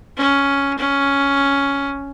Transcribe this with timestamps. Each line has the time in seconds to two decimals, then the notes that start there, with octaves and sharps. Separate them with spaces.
0.17 C#4
0.78 C#4